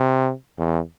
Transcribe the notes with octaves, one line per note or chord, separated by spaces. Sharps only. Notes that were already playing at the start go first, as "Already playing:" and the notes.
Already playing: C3
E2